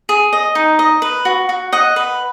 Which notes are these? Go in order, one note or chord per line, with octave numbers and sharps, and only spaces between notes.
G#4
D#5
D#4
D#5
B4
F#4
F#4
D#5 F#5
B4